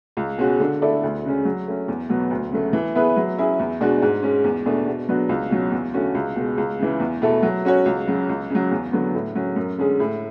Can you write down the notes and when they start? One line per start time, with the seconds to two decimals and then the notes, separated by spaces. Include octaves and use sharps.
0.17 C#2
0.38 B2 G#3 C#4 F#4
0.60 D3
0.82 A3 E4 A4 D5
1.03 D2
1.25 C#3 G#3 C#4
1.45 F#3
1.67 A3 C#4
1.88 E2
2.09 B2 F#3 B3
2.31 D2
2.52 C#3 F#3 A3
2.73 E3
2.95 B3 E4 G#4 B4
3.16 F#3
3.38 C#4 E4 G#4
3.60 E2
3.81 B2 G#3 D4 F#4
4.02 G#2
4.22 G#3 C#4
4.44 E2
4.65 B2 A3 D4 G#4
4.87 B2
5.09 F#3 B3 D4 F#4
5.29 C#2
5.50 B2 F#3 C#4
5.72 E2
5.94 D3 A3 C#4 F#4
6.15 C#2
6.36 B2 G#3
6.58 C#2
6.79 C#3 E3
7.00 E2
7.22 B2 A3 E4 A4
7.43 F#3
7.65 C#4 F#4 C#5
7.86 C#2
8.07 C#3 F#3
8.29 C#2
8.50 C#3 F#3
8.71 E2
8.92 D3 F#3 B3
9.14 A2
9.35 F#3 C#4
9.56 F#2
9.78 D3 G#3 C#4 G#4
10.00 A2